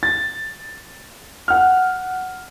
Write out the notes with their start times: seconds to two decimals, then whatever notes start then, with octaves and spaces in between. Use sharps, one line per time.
0.03 A6
1.48 F#5 F6